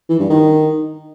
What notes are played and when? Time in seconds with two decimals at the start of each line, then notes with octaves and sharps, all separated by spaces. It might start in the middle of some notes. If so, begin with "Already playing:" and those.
0.09 E3
0.19 G2
0.30 D#3